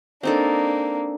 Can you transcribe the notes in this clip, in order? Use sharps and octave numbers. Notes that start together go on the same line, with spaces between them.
A#3 C4 D4 D#4 A4